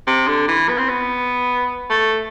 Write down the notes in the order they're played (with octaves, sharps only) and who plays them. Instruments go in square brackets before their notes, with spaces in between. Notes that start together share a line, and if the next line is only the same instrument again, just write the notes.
[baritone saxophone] C3
D3
E3
B3
C4
B3
A3